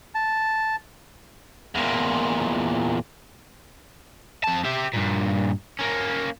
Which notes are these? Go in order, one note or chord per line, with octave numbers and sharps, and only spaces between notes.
A5
E2 A#2
F2 A5
G4 E5
G2 A#2
A#3 C#4